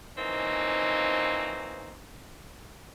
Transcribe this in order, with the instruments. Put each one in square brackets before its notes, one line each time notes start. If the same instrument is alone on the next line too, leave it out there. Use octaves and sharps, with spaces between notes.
[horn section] E3 F3 A#3 C4 C#4 D#4